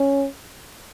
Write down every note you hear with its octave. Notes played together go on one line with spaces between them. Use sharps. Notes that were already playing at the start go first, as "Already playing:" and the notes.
Already playing: C#4